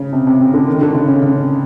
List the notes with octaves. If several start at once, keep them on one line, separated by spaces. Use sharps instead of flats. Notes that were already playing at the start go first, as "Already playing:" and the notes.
Already playing: C#3
C3
C3
C#3
D3
D#3
D3
C#3
C#3
C#3